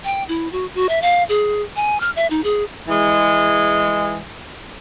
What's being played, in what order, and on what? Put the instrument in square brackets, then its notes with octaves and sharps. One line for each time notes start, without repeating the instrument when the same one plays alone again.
[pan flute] G5
E4
F#4
F#4
E5
F5
G#4
G#5
F6
E5
D#4
G#4
[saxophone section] E3 G#3